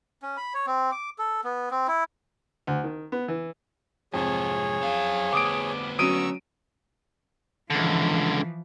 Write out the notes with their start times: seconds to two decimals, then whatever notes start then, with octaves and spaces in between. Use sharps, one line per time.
0.22 C#4
0.37 B5
0.54 C#5
0.67 C4
0.92 D6
1.19 A4
1.44 B3
1.71 C4
1.88 E4
2.67 D2
2.84 D#3
3.12 B3
3.28 E3
4.14 F2 G#2 C3 G#4 C#5
4.81 F#2 F5
5.33 D2 B3 D6 D#6 D7
5.99 F#3 C#4 A#5 C#6 D#6 E6 D7 D#7
7.70 C#2 D3 E3 F3